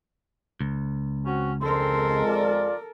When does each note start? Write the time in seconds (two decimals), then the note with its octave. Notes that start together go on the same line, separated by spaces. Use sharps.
0.61 C#2
1.25 C4 C#4 F#4
1.62 F2 D3 G#3 C4 A4 A#4 C6
2.24 F4 D5